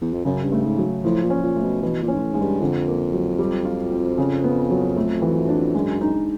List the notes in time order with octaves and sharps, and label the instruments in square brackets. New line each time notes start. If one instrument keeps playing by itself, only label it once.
[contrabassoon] E2
F2
[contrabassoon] F#2 [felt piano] C#3
[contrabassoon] G2
[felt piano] A3
[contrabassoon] G#2
[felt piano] F#3
[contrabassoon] A2 [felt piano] F3
[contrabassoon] A#2
[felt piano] C#4
[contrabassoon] A#2
[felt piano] A3
[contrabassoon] B2
[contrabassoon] B2 [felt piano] E3
[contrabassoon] A#2
[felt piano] C#4
[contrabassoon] G#2
A2
[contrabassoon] G#2 [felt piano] G#3
[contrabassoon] G2
[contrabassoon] F2 [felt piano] D3
[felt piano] A#3
F#3
G3
F4
C4
C#3
B3
F#3
A3
E3
D4
[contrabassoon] F#2 [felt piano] G#3
[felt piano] D#4